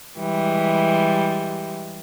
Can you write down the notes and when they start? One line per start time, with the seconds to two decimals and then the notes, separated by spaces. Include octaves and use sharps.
0.19 E3 G3 G#3